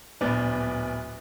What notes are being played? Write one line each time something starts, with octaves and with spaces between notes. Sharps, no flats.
D1 A#1 B3 D5